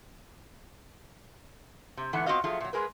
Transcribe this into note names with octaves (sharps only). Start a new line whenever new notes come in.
C3
G#2 D3 E3 A3 B3 F#5
B3 C4 F4 F#4 D#5 F5
F3 F#3 A3 F4 G#4
A#2 F#3
G#3 G#4 A#4 B4